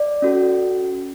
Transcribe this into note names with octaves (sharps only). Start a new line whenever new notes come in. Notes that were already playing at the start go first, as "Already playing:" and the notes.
Already playing: D5
C#4 F#4 A4